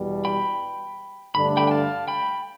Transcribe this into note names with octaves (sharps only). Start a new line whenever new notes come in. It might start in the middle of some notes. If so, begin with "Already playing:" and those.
Already playing: E2 B2 G3
G5 B5
G2 D3 A3 D4 B5
G5 B5
G5
F5 A5
G5 B5